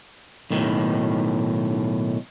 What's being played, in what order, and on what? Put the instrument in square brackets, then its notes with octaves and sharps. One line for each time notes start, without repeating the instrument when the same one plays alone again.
[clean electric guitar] B1 A2 D#3